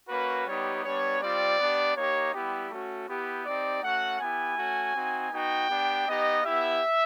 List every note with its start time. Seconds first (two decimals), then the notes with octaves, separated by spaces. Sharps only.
0.08 A#3 C#4 F#4 B4
0.46 G3 B3 D#4 G4 C#5
0.83 G3 B3 D4 C#5
1.20 G3 C4 F4 D5
1.58 B3 D4 G4
1.96 A#3 D#4 G4 C#5
2.33 G3 B3 E4 G4
2.70 A3 C#4 F#4
3.07 B3 E4 G4
3.45 C4 D#4 G4 D5
3.82 A3 C#4 F#4 F#5
4.19 B3 E4 G4 G#5
4.57 A3 C#4 F#4
4.95 C4 D#4 F#4
5.31 B3 D#4 F#4 G5
5.69 B3 D4 G4
6.06 B3 D#4 G4 D#5
6.43 B3 E4 G4 E5